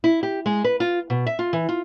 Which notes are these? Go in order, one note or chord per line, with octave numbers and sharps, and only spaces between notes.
E4
G4
G#3
B4
F4
B2
E5
F4
E3
F4